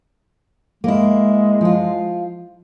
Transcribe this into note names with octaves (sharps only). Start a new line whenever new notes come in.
G#3 A#3 E4
F3 F4